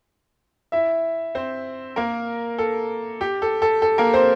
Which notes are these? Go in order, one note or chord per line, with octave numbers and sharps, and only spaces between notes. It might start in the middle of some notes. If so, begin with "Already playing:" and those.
E4 E5
C4 C5
A#3 A#4
A4
G4
A4
A4
A4
A#3 A#4
C4 C5